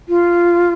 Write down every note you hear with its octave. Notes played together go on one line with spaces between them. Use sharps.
F4